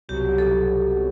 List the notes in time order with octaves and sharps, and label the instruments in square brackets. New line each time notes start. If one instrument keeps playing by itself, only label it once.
[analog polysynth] C2 B2 F#3 [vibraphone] G4
[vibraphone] A4